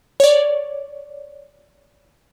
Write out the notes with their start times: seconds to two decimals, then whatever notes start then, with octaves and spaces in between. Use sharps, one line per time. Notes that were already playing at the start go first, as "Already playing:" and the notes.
0.20 C#5 D5